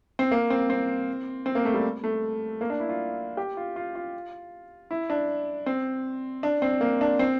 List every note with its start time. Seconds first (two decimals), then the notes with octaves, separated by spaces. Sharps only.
0.19 C4
0.31 A#3
0.50 C4
0.70 C4
1.46 C4
1.55 A#3
1.65 A3
1.74 G3
2.04 A3
2.61 A#3
2.70 D4
2.80 E4
2.89 F4
3.37 G4
3.57 F4
3.76 F4
3.95 F4
4.91 E4
5.10 D4
5.66 C4
6.43 D4
6.62 C4
6.81 A#3
7.01 D4
7.19 C4